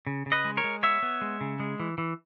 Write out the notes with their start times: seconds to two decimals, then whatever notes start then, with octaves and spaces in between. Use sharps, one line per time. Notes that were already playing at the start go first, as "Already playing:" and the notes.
0.07 C#3
0.26 C#3
0.32 B4 D#5
0.45 G#3
0.57 A#4 C#5
0.64 G#3
0.83 B3 C#5 E5
1.03 B3
1.21 G#3
1.41 C#3
1.60 G#3
1.80 E3
1.98 E3